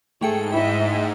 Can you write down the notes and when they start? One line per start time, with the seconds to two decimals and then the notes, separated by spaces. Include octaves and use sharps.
0.21 G#2 A3 G#4 A4 G5 C#7
0.53 E4 D#5 E5